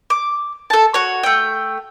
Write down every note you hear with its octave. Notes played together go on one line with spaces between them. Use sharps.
D6
A4 A5
F#4 C#5
A3 G5